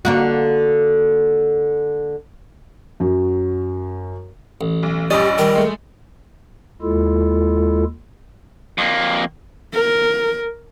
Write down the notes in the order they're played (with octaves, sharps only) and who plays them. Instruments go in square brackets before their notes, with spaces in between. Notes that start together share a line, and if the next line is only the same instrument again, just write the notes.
[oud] D3 A#3 F#4
[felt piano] F#2 F#3
[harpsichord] A1
[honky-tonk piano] B1
[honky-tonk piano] A#1 G2 A6 [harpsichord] C#4 [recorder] G4 [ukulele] D#5
[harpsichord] D#3 G3 [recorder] A#4
[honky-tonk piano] G#3 A3
[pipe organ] D#2 G#3 E4 F4 A4
[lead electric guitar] F2 A#3
[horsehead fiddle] A#4